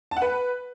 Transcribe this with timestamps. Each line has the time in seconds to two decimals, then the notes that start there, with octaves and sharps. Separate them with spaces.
0.11 A5
0.17 F#5
0.22 B4